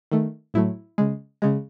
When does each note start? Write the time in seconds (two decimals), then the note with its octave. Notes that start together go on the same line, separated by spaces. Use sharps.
0.11 D#3 A3
0.54 A2 F#3 A3 E4
0.98 C#3 G#3
1.42 C#3 G#3